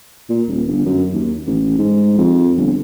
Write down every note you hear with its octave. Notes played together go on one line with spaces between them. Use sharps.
A#2
D#1
G1
F#2
D#2
A1
G#2
F2
G1